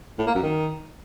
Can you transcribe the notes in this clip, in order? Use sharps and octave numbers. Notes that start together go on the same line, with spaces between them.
A2
A#3
F#2
D#3